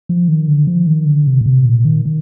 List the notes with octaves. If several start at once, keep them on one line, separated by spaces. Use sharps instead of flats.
F3
D#3
D3
F3
D#3
D3
C3
A#2
C3
A#2
D#3
D#3